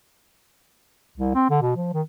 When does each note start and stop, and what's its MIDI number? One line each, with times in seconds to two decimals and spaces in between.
1.17 1.34 36
1.35 1.48 60
1.50 1.58 50
1.62 1.72 47
1.76 1.90 53
1.93 2.02 51